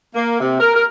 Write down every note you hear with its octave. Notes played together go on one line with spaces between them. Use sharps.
A#3
C3
A#4
A#4